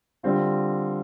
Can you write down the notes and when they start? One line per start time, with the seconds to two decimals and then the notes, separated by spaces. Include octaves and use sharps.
0.23 D3 G3 C4 F4